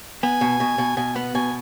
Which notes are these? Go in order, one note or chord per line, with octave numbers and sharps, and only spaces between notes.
B3 G#5
B2
B2
B2
B2 G#5
B3 F#5
B2 G#5